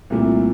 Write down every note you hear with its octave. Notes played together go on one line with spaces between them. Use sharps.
C2 A#2 A3